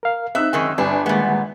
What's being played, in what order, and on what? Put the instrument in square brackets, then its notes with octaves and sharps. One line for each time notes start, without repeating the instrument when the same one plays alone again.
[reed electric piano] A#4 F5
[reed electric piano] C4 [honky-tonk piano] D#4 E6 F#6 [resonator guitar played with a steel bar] E5
[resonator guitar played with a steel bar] F#2 D#3 G#3
[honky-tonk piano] G1 G#5 [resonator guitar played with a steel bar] D4
[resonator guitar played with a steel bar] A#2 B3 [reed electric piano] D#3 G#3 A#3